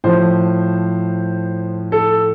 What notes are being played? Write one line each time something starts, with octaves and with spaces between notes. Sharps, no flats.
A2 F3 C5
A4